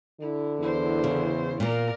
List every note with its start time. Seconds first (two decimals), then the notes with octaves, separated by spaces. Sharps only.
0.20 D3 E4
0.59 E2 E4 C5
1.04 C#3
1.60 A#2 A#3 A#4 D5